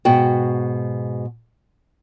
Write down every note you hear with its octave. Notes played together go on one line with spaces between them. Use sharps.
G#2 B2 F#4 G5